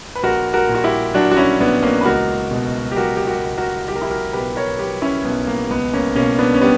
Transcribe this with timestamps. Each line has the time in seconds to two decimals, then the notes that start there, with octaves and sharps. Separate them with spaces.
0.16 B4
0.23 A#1 F#4 A#4
0.53 F#4 A#4
0.69 A#2
0.75 F#4
0.84 E4 G4
1.14 F#3 D4 F#4
1.31 F#4
1.37 C#4 E4
1.60 A#1 B3 D4
1.83 A#3 C#4
2.01 B4
2.05 C#2 F#4 A#4
2.51 B2
2.92 G4
2.96 F#3 F#4 A#4
3.17 G4
3.27 F#4 A#4
3.43 C#2
3.58 F#4 A#4
3.88 B1 G4
3.96 A#4
4.01 E4 G4
4.10 F#4 A#4
4.33 B2 G4 B4
4.56 A#4 C#5
4.79 F#3 G4 B4
5.02 C#4 E4
5.24 B1 B3
5.47 A#3
5.70 C#2 B3
5.93 A#3 C#4
6.16 B2 A#3 C#4
6.38 B3 D4
6.54 C#4
6.61 G3 B3 D4